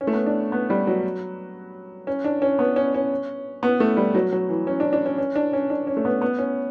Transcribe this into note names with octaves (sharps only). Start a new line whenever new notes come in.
C#4
A3
B3
D4
B3
G3
F#3
C#4
D4
C#4
B3
C#4
C#4
B3
A3
G3
F#3
F#3
E3
C#4
D4
D4
C#4
C#4
D4
C#4
D4
C#4
A3
B3
B3
C#4